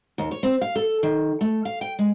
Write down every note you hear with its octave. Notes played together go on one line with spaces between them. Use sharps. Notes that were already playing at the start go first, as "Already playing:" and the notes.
D#2
C#5
C4
F5
A4
D#3
A3
F5
G5
G#3